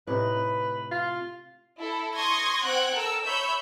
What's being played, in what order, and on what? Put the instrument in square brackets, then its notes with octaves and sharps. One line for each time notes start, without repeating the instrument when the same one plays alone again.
[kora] A2 C3 D#4 [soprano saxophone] B4
[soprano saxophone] F4
[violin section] E4 A4
C6 C#6 D#6 G#6 A#6
C4 F#5 G5 F#6 G#6
A4 A#4 E6
C#5 E5 B5 E6 G6